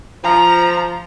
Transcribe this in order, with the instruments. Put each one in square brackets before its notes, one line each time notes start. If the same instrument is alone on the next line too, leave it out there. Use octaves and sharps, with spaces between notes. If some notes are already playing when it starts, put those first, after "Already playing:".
[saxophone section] F3 [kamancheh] A#5